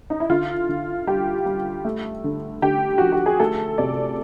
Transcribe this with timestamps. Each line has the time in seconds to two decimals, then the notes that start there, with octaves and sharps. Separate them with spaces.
0.10 D#4
0.20 E4
0.30 D3 F4
0.69 D3
1.07 G3 G4
1.46 G3
1.85 A3
2.24 D3
2.62 D3 G4
2.98 F3 F#4
3.12 G4
3.26 G#4
3.40 A3 A4
3.78 C3 D5